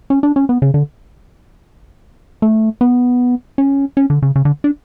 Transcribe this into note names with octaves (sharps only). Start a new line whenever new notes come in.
C#4
D4
C#4
B3
C#3
D3
A3
B3
C#4
C#4
D3
C#3
C#3
D3
D4